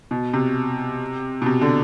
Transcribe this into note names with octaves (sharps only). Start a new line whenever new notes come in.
B2
C3
B2
C3
D3